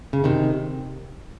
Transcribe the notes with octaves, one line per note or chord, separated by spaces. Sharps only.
C#3
C3 D#3